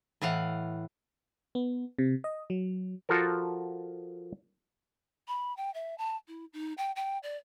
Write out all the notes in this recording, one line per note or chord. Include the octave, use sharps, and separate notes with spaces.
A2 E3 F5 F#5
B3
C3
D#5
F#3
F3 F4 F#4 A4 A#4
B5
G5
E5
A5
E4
D#4
G5
G5
D5